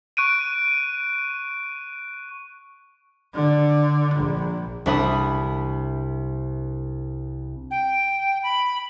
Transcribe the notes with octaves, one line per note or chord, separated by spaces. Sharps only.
C#6 F#6 D7 D#7
D3
A#1
C2 D4 E5 B5 D#6
G5
B5